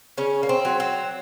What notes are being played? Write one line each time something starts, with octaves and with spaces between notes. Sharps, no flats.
C#3 C#4
A#3
C4
F#3
C4